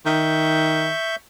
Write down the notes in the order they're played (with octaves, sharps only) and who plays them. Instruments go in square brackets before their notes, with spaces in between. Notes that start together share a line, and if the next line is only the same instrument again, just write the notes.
[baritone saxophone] D#3 [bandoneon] E5 C#6 G6